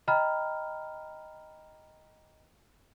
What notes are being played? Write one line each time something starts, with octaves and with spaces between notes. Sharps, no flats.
D#5 G5 A#5 B5 F6